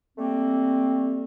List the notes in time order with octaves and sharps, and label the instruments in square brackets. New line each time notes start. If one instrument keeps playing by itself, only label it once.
[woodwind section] G3 A3 A#3 C4